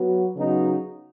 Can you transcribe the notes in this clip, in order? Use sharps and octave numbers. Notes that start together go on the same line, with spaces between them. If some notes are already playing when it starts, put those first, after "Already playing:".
Already playing: F#3 B3 F#4
C#3 F#3 B3 D#4 F#4